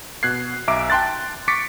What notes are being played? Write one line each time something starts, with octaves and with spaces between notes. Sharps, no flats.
B2 F#6 G#6 C7
B1 E5 A#5 D6 D7
G5 A5 C6 F#6 A6
C#6 D6 A6 B6 C#7 D7